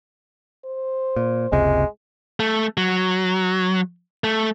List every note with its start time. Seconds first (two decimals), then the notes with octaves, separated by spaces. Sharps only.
0.65 C5
1.16 A#2
1.52 F#1 C#2 C3 G#3
2.40 A3
2.77 F#3
4.24 A3